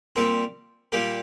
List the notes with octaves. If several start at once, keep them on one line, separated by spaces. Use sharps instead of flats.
A#2 G3 C4 A#4
A#2 G3 A#3 G4 A#4